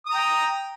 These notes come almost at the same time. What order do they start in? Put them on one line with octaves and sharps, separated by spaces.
D#6 A#5 G5